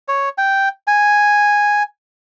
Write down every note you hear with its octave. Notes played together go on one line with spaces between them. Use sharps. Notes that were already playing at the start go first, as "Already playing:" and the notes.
C#5
G5
G#5